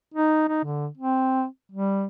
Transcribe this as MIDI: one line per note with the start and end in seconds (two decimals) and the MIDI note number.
0.14 0.48 63
0.48 0.64 63
0.64 0.88 50
0.98 1.45 60
1.71 2.07 55